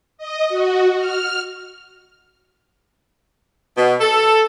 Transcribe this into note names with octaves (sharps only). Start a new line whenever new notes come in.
D#5
F#4
F6
B2
A4